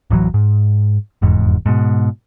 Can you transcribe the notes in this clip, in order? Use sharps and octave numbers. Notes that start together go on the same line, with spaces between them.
D1 A1 E3 F#3
G#2
F1 E2 G#2
G#2 B2